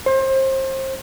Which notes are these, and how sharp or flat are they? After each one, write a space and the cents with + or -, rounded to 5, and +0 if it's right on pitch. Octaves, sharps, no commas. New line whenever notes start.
C5 +30